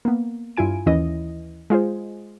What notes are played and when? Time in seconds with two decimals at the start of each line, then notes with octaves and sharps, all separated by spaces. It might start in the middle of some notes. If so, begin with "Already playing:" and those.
0.05 A#3 B3
0.57 G2 E4 F4 G#5 D7
0.86 D#2 E3 C#4 E4 D#5
1.70 G#3 F4 G#4 C5